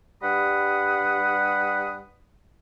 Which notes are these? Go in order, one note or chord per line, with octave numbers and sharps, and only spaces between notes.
G2 G3 F#5 B5 D#6